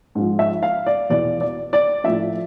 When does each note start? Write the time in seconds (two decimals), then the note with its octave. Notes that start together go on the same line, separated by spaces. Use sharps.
0.15 G#2 F3
0.39 E5
0.63 F5
0.86 D5
1.09 E2 B2 D5
1.41 D5
1.73 D5
2.04 A2 F3 E5